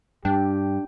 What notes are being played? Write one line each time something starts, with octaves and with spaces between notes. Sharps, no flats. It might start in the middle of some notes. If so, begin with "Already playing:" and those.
G2 D4 G4 G5